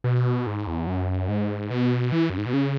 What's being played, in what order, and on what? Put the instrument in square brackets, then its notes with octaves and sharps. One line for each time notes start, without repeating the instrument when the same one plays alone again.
[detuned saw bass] B2
G#2
E2
F#2
G#2
B2
E3
F#2
G#2
B2
C#3